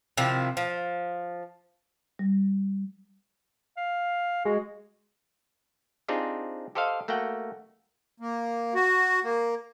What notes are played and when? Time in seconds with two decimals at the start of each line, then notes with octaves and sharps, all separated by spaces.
0.17 C3 D#3 F3 E4
0.57 F3
2.19 G3
3.77 F5
4.45 G#3 F#4
6.08 C4 D4 D#4 F4 G4 G#4
6.75 G4 A4 C5 D#5 F5
7.08 A3 A#3 F#4 F#5 G5
8.20 A#3
8.75 F#4
9.24 A#3